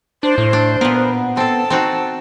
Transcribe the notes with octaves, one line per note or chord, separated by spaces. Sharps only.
D4 C5
A2
D4
A#2 B3 A#4
C4 A4 A5
C4 D#4 F#4